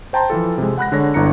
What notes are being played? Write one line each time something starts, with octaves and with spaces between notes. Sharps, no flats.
C5 G5 A5 A#5 C6
E3 F3 F4 A4
C3 G#3
F#5 B5 F#6 A#6
D3 G#3 C#5 A#6
G1 D3 E4 A#5 C#7